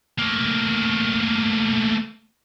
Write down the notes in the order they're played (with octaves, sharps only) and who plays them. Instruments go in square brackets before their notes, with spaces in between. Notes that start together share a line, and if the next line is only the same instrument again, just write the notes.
[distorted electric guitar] A3 A#3